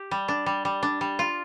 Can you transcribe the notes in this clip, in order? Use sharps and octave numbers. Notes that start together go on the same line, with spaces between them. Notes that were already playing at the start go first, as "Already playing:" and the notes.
Already playing: G4
G3
D4
G3
G3
D4
G3
F4